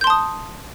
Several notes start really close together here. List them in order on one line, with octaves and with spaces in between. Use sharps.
G6 C6 A5 D#6